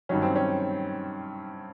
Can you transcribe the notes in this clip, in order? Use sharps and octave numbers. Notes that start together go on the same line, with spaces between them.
G2 D#3 F#3 C#4
C4
C#4